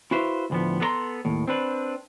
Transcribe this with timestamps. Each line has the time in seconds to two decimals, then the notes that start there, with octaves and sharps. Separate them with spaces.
0.11 E4 F#4 B4 C5 E5 F5
0.50 D2 A2 E3 F3 B3
0.80 B3 A4 C#5 A#5 C6
1.25 D#2 A2
1.48 C4 D4 B4